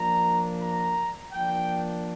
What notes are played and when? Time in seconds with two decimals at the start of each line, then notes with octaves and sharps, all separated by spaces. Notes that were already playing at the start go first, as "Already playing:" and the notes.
Already playing: F3 A#3 D4 A#5
0.62 A#5
1.33 F3 A#3 D4 G5